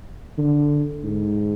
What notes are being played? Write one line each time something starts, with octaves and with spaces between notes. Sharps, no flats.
D3
G#2